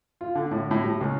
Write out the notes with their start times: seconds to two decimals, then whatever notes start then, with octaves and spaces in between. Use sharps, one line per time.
0.21 F4
0.35 D3
0.51 A2
0.71 A2
0.84 G3
1.01 C#2